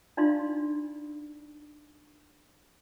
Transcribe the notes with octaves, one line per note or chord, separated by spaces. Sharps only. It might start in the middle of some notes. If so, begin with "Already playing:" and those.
D4 D#4 F4 D5 F5 C6